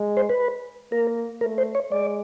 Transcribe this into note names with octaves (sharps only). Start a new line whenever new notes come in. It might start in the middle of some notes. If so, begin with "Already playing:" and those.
Already playing: G#3
C5
B4
A#3 A#4
A3 A#4
C5
C#5
G#3 D5